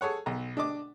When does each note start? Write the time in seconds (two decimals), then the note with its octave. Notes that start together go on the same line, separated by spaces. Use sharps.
0.01 G#4 A4 C#5 F#5
0.26 B1 A#5
0.57 D4 D#5 D6